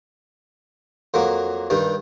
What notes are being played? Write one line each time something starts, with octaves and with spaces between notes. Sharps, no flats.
F2 F#3 A#3
G2 D#3 G3